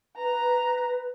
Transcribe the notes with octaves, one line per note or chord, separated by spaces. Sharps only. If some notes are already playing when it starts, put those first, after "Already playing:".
B4 A#5